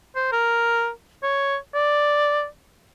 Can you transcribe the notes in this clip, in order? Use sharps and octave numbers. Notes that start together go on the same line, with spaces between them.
C5
A#4
C#5
D5